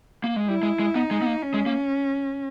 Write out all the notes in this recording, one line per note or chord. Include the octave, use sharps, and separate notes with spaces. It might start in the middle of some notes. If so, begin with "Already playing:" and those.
A#3
G#3
G3 E4
G#3
G#3
B3 D#4
G#3
B3
A#3
C#4
G#3
A#3